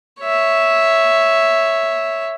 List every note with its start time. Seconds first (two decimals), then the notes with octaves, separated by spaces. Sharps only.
0.21 C#5 E5